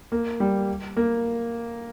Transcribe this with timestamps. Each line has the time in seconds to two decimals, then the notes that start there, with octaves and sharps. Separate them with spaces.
0.12 A#3
0.40 G3
0.97 A#3